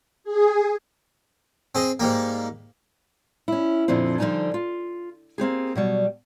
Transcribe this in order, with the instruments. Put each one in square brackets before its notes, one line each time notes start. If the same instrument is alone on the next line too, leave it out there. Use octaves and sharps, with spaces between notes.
[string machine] G#4
[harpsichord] C4 G#4 D#5
G#2 G3 A#3
[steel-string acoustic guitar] C#4 E4
F2 A#2 D3 F3 C4
D3 F3 G3 D#4 G#5 A5
F4
A#3 C4 G4 G#4
B2 F#3 G3